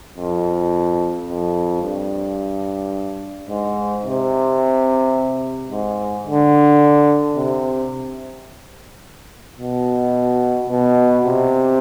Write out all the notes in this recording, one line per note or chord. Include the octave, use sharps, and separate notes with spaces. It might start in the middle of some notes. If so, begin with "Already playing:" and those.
F2
F2
G2
G#2
C3
G#2
D3
C3
B2
B2
C3